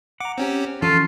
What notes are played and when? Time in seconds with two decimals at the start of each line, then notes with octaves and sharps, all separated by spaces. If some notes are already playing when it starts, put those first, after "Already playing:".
0.20 F#5 A#5 D6
0.38 C4 C#4 G4
0.82 E3 F3 C#4 F4 A4